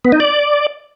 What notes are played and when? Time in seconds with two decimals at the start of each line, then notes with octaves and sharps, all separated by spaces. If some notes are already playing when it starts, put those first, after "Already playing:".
0.05 B3
0.12 D#4
0.20 D5